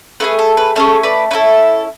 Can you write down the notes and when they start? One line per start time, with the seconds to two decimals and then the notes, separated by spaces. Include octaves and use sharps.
0.20 A3 E4 G#4 B4
0.39 A4
0.57 B4
0.75 A3 C#4 G#4 A4 C#5
1.03 B4 D5
1.31 C#4 E4 A4 B4